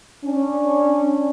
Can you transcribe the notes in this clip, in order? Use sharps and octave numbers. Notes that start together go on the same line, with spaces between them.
C#4 D4